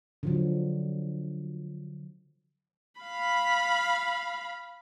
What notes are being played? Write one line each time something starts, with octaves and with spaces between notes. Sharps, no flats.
D3 F3 F#3
F5 B5